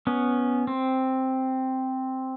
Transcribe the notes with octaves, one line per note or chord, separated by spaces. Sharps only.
B3 C#4
C4